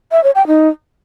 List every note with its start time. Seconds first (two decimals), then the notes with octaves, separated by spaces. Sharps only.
0.12 E5
0.23 C#5
0.35 G5
0.47 D#4